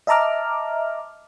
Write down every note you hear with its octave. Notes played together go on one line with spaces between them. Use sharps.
D#5 E5 A5 A#5 D6 F6